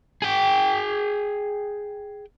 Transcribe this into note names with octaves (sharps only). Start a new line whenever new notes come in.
G#4 G5